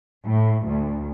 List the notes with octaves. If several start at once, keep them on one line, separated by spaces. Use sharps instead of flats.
A2
D2